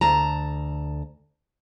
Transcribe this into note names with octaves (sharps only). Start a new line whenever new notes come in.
D2 A5 A#5